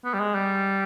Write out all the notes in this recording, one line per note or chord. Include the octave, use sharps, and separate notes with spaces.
B3
G3
G#3
G3